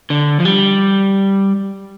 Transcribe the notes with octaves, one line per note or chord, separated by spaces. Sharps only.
D3
F3
G3